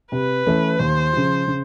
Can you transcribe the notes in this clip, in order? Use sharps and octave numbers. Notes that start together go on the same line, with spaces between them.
C3 B4
E3 A3 C#4 E4
D#2 C5
C#3 F3
C#3